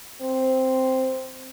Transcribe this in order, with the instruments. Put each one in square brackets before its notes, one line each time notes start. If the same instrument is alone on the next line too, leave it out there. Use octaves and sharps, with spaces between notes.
[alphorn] C4